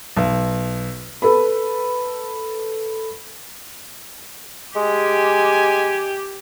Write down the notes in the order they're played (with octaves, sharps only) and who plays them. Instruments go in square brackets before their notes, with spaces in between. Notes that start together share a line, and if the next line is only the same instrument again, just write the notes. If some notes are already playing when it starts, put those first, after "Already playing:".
[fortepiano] B1
[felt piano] A4 B4 B5
[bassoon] G#3 [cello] G4 [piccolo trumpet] G#5